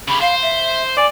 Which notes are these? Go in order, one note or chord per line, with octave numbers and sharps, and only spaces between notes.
C#3 G4 B5
C5 F5
E5
D5 G#5